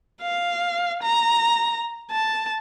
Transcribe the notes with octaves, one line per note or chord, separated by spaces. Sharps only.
F5
A#5
A5